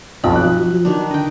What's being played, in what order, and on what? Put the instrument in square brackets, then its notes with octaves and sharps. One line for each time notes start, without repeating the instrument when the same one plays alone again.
[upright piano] B1 F2 [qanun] B5
[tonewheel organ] F3 F#3 [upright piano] F#6
[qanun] D#3 D4
[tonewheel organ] D3 [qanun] D#5 G5